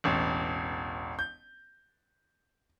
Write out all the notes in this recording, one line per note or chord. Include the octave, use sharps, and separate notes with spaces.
E1 A1
G6